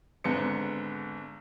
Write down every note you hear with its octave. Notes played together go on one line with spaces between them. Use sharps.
G#1 G#2 D3 B3 C#7